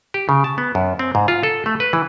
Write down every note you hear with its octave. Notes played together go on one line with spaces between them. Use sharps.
G4
C#3
A5
B3
F#2
C4
G#2
F4
A4
A3
B4
E3